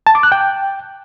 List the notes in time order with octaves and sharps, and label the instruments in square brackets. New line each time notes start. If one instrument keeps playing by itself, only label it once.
[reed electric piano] A5
D6
F#6
G5